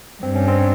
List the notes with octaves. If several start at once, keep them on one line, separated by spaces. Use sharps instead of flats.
G2 C4
C#4
C4